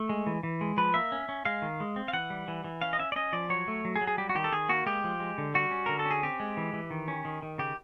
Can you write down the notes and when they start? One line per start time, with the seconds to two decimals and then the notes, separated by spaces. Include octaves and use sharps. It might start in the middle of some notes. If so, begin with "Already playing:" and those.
Already playing: A3
0.09 G#3
0.27 E3
0.43 E3
0.61 G#3
0.77 F3 B4
0.94 A#3 E5
1.12 C#4
1.29 C#4
1.45 G#3 F5
1.62 D#3
1.80 G#3
1.96 C4
2.08 F5
2.13 E3 F#5
2.30 G3
2.48 E3
2.64 E3
2.82 C#4 F5
2.93 D#5
2.99 C#4 E5
3.12 D5
3.16 C#4 D#5
3.33 F3 D5
3.49 F#3 C#5
3.68 A3
3.85 F#3
3.96 G#4
4.01 F#3
4.07 G#4
4.18 G3 G4
4.29 F#4
4.35 D#3 G4
4.44 A4
4.52 D#3 G#4
4.69 A#3 F#4
4.86 G#3 G4
5.04 F3
5.20 G#3
5.38 D3
5.54 G3 F#4
5.71 C#4
5.86 D3 A#4
5.99 A4
6.05 C#4
6.11 G#4
6.23 C4 G4
6.40 G#3
6.57 E3
6.73 E3
6.90 D#3
7.08 C#4
7.25 D#3
7.42 D#3
7.58 C#3 G4